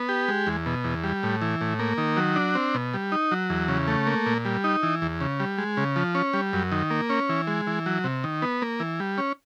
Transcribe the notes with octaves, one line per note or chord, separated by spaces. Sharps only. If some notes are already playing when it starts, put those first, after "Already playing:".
Already playing: B3
G4
G#3
E2
B2
E2
G3
A2
E3
A2
A#3
D#3
F#3
D4
C4
B2
G3
D#4
F#3
E2
C#3
A3
A#3
A#2
G3
D#4
E3
E2
C#3
G3
G#3
C#3
F3
C#4
G3
F#2
D#3
A#3
C#4
E3
G#3
E3
F#3
C3
D#3
B3
A#3
E3
G3
C#4